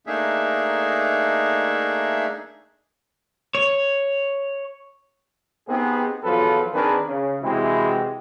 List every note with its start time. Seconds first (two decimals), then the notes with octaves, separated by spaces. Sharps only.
0.07 A3 A#3 D4 D#4 G#4 E5
3.55 C#5
5.68 B3 C4 D#4 G4 G#4
6.24 E2 F3 F#3 F4 A4 B4
6.74 D#3 C4 D4 G#4 A#4 B4
7.07 C#3
7.42 C3 E3 G#3 C4 E4 F#4